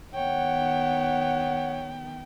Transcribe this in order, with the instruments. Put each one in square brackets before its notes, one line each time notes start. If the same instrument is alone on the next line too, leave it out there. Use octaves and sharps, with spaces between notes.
[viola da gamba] D#3 B3 [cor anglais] C#5 [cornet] F#5 [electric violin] G5